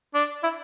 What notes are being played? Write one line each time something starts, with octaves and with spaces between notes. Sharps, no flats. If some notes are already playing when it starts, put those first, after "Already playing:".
D4
E4